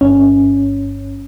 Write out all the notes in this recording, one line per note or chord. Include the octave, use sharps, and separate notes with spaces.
G1 C#4